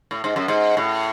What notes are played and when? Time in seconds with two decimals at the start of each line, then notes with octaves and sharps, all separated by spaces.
0.11 A2
0.24 G#2
0.36 F#2
0.48 G#2
0.77 A2